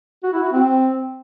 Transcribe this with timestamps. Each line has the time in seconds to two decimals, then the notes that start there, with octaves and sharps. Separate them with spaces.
0.23 F#4
0.33 E4
0.43 F#4
0.52 C4